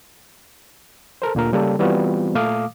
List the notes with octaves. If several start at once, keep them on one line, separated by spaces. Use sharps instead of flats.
A4 A#4 C5
D2 A#2 D3 A#4
C#3 G3 A#3 A4
E3 G3 B3 C4 F4 F#4
A#2 A3 F5 D6 D#6